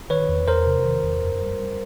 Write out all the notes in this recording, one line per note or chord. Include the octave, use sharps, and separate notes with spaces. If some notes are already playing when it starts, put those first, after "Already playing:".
D#3 B4 C#5
E2
E2 A#4 C5
C3
D#3
E2
F#2
G3
G3